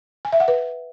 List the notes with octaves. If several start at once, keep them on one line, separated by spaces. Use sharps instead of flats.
G#5
E5
F#5
B4